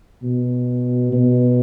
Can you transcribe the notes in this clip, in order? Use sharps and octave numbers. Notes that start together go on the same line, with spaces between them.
B2
B2